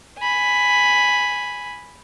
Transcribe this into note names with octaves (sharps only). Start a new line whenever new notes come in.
G#5 B5